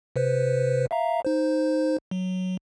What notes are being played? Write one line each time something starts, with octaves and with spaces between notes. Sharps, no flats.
C3 B4 C5
E5 F5 A#5
D#4 C5
F#3